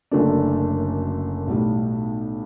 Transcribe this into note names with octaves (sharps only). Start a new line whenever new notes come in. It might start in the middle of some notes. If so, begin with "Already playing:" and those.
F#1 F#2 D3 A3 D4
B1 A2 G3